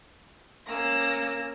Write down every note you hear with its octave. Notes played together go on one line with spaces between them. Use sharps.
A#3 C#4 D6 E6 A#6